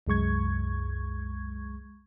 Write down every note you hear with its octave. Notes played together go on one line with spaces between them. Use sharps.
C2 F#2 G#3 C#6 G#6